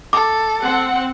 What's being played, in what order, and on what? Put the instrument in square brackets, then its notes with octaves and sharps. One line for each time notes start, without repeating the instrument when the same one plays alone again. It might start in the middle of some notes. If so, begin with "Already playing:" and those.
[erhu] A4 [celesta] D6
[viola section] C4 F#5